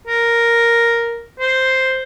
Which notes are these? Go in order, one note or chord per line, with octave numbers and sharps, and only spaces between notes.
A#4
C5